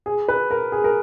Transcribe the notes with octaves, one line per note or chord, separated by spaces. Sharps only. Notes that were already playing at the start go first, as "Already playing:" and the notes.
G#4
B4
A#4
G#4
A#4